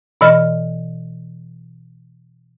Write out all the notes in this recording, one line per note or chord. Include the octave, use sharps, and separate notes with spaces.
B2 E3 D#5 B5 F6